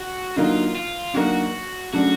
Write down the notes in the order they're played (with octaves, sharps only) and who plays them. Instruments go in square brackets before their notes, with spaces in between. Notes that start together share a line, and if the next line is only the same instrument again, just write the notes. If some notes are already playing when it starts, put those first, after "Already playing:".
Already playing: [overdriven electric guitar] F#4
[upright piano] D3 F#3 A#3 D#4 [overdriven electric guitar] F4
[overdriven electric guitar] F4
[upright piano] D3 F#3 A#3 D#4 [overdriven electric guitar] F#4
[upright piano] C#3 F#3 A3 D4 [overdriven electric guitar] F#4